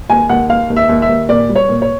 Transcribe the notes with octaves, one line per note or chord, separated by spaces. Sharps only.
D#2 G#5
D#2 F#5
D#2 F5
D#2
E5
D#2
E5
D#2
A#2 D5
G3
C#5
A#2
C#5